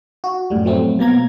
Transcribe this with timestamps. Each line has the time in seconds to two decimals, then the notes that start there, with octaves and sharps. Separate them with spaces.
0.24 F#4
0.50 F#2 A2 G3
0.65 F3 F#3 A3 C4
0.99 B2 A#3 A#5 G#6